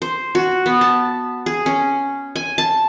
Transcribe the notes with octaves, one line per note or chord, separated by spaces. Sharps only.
C5
F#4
B3
A5
G#4
C#4
G#5
A5